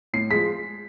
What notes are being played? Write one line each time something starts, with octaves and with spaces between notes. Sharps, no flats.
A2 C7
F3 G#3 B6